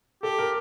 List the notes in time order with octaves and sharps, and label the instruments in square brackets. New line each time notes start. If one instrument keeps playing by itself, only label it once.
[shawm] G4 [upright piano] A4
[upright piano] A#4